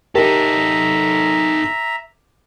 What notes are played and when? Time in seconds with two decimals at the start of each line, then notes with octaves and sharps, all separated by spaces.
0.15 D#4 G4 A4 A#4 E5 A#5